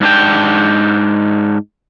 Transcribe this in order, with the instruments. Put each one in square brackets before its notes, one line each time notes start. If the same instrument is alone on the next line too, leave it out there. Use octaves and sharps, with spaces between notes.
[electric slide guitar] G#2 D4 G5